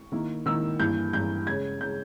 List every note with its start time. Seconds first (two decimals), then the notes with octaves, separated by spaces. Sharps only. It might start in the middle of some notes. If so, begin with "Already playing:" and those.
Already playing: C#6
0.12 D#3 A#3 E4
0.46 D#3 A#3 E4 E6
0.79 G2 E3 A#3 G6
1.13 G2 E3 A#3 G6
1.47 C#3 G#3 C#4 G#6
1.81 C#3 G#3 C#4 G6